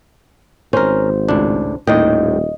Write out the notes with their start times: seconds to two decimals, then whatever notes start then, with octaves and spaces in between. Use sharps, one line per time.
0.73 G#1 C#4 A#4 C5
1.29 C#2 A2 D4
1.87 D#1 D#2 A2 D#5 G5